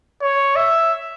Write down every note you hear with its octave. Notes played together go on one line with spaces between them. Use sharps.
C#5
E5